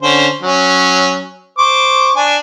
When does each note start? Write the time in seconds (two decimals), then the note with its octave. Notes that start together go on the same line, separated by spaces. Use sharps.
0.02 D3 C#4 C5
0.42 F#3 C#4
1.58 C5 C#6 D6
2.16 D4 G#5